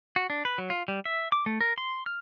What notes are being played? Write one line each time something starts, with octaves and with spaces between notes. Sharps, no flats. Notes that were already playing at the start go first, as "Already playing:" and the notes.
F#4
D4
B4
F#3
F4
G3
E5
D6
A3
A#4
C6
F6